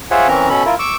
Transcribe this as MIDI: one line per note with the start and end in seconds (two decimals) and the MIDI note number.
0.11 0.28 65
0.11 0.28 68
0.11 0.28 72
0.11 0.28 73
0.11 0.28 76
0.11 0.28 78
0.28 0.49 52
0.28 0.49 60
0.28 0.49 61
0.28 0.49 70
0.28 0.49 82
0.49 0.64 47
0.49 0.64 61
0.49 0.64 69
0.49 0.64 83
0.65 0.75 64
0.65 0.75 65
0.65 0.75 70
0.79 0.96 85
0.79 0.96 86
0.79 0.96 88